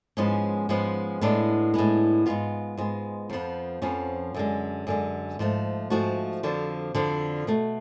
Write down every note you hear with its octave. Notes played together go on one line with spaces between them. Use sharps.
G#2 F3 G#3 B3 C#4
G#2 F3 G#3 B3
A2 G#3 B3 D4
A2 G#3 B3
G#2 G#3 B3 F4
G#2 G#3 B3
F2 F3 B3
F2 F3 B3 C#4
F#2 D3 G#3
F#2 D3 G#3
G#2 F3 A3
G#2 F3 A3 F#4
F2 D3 F3
F2 D3 F3
B2 A3